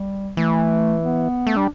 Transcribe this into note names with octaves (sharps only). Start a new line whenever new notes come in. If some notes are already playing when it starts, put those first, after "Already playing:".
Already playing: G3
E3 A3
B3
A3
G3 D4